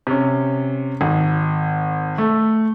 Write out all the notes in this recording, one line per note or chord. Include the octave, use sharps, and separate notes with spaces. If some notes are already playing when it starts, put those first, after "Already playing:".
C3 C#4
G#1
A3